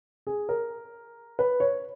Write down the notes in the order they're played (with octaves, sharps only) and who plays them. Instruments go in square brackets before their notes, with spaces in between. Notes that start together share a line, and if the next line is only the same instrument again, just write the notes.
[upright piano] G#4
A#4
B4
C#5